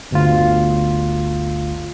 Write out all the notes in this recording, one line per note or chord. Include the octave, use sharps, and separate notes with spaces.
G1 D2 F4